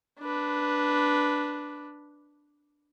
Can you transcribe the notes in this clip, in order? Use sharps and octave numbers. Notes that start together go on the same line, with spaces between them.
D4 B4